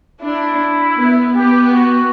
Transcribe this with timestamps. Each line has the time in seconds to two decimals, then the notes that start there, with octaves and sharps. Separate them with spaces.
0.21 D4 E4
0.96 B3
1.34 B3 G4
1.72 F#4